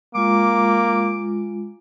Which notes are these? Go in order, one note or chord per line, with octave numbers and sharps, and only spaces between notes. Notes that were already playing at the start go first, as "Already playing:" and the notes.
G#3 A#3 F4 D6